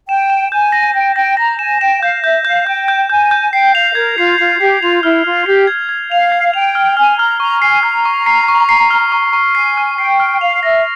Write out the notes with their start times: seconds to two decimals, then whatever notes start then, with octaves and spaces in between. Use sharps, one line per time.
0.08 G5 E7
0.30 E7
0.52 G#5 G6
0.72 A#6
0.94 G5 A#6
1.16 G5 A#6
1.37 A#5 A#6
1.59 G#5 E7
1.80 G5 E7
2.03 F5 G6
2.23 E5 G6
2.45 F5 G6
2.67 G5 G6
2.88 G6
3.10 G#5 G6
3.31 G6
3.53 G5 C7
3.75 F5 F7
3.95 A#4 G#6
4.18 F4 C7
4.38 F4 C7
4.60 G4 C7
4.82 F4 F7
5.03 E4 F6
5.24 F4 F6
5.46 G4 C7
5.67 G#6
5.89 G#6
6.11 F5 F7
6.32 G#6
6.54 G5 F7
6.75 F6
6.97 G#5 F6
7.19 A#5 F6
7.40 A#5 C#6
7.62 G#5 C7
7.83 A#5 F6
8.05 C#6
8.26 C7
8.48 C#6
8.69 C7
8.90 F6
9.12 C#6
9.33 C#6
9.55 G#5 C7
9.77 F6
9.98 G5 C7
10.20 F6
10.41 F5 F7
10.63 E5 A#6